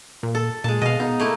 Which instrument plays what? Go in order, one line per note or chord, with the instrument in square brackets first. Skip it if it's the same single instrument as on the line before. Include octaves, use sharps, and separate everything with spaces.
[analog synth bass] A#2
[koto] A4
[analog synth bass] A#2 [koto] G#3 A5
[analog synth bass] B2 [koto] D#5 F5
[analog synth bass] B2 [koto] D#4
[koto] A3 A#3 E4